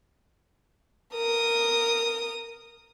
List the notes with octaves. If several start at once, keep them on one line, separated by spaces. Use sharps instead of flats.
A#4 D#6